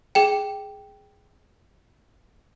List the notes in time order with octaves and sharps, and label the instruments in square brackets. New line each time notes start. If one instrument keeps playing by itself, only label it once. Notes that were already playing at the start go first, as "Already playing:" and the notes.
[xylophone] G#4 G5